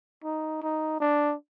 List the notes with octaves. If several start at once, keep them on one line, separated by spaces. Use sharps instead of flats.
D#4
D#4
D4